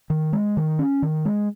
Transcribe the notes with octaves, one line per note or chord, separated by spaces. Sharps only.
D#3
G#3
D#3
C#4
D#3
G#3